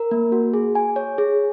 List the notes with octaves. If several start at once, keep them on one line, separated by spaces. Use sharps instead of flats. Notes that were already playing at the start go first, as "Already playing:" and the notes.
Already playing: A#4
A#3
F#4
G#4
G#5
C#5
G#4